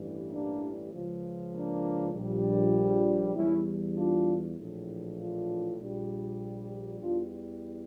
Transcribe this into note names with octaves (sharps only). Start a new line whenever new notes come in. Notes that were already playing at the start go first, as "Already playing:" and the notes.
Already playing: A1 G2 E3 G3
A#3 D4
C#2 C#3 F3
A#3 D4
A#1 A#2 G3
E2 E3 G3 C#4 E4
D4 F4
A#1 A2 E3
D4 F4
A#1 A#2 G3
E2 E3 G3 D4 F4